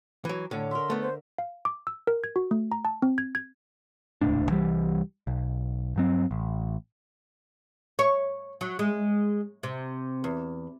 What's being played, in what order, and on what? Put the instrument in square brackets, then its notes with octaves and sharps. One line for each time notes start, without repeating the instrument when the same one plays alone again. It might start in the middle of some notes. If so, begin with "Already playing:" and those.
[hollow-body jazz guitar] E3 F#3
[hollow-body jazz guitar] A2 [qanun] D3 C#5 D6
[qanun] A#4 E5 [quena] C6
[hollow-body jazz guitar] A3 B3
[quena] C5
[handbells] F5
D6
E6
A#4
G#6
F#4
A3
A#5
A5
C4
G#6
G#6
[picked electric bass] D#1 C#2 A2 D4
C2 E3 G3
B1
G2 F#3 C4
A1
[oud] C#5
F#3
G#3
C3
E2